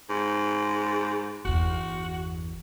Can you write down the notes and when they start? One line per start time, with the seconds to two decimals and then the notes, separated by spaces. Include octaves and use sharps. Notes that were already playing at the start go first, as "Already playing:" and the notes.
0.10 G#2
1.45 G1 E2 F#4